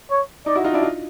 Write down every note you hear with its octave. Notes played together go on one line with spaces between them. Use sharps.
C#5
D#4 D5
E4 F#4
D#4 F4
D4 E4
D#4 F4